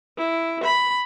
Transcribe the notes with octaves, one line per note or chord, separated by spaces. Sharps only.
E4
B5